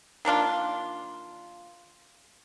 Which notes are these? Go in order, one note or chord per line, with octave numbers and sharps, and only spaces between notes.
D#3 A#3 D4 F4